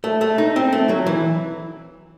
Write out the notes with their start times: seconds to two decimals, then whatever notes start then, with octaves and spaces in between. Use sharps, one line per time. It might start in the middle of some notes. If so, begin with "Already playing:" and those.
0.04 A3
0.21 A3
0.38 D#4
0.56 C4
0.73 A3
0.89 F#3
1.06 E3